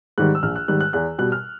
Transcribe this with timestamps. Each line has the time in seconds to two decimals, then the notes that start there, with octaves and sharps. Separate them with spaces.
0.18 G#2 D#3 G3 F#6
0.35 E6
0.43 A#1 F6
0.56 F#6
0.68 G#2 D#3 G3 F#6
0.81 F#6
0.93 E2 F#6
1.18 B2 G3 F#6
1.32 F6